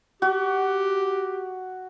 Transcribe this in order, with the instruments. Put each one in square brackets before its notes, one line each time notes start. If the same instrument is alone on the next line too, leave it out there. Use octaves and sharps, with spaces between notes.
[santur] F#4 [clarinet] G4